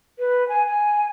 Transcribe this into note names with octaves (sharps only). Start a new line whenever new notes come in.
B4
G#5
G#5